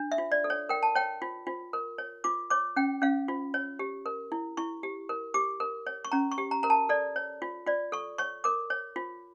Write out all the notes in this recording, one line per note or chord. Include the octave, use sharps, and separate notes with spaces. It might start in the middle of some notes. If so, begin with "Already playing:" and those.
Already playing: D4
E5
F4
D5
A4
C#5
A#4 G5
A5
C#5 G5
F4
F4
A#4
C#5
F4 D6
C#5 D6
C#4 G5
C#4 F5
F4
C#5
G4
A#4
E4
E4 C#6
G4
A#4
G4 D6
A#4
C#5
C#6
C#4 A#5
C#6
G4
A#5
A#4 A#5
A5
A4 D5
C#5
F4
F4 D5
A4 C#6
C#5 C#6
A#4 D6
C#5
F4